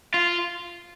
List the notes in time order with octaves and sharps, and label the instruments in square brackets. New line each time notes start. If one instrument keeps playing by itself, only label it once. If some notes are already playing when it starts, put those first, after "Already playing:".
[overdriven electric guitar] F4